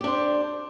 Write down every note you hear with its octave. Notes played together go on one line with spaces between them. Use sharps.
D4 G4 C5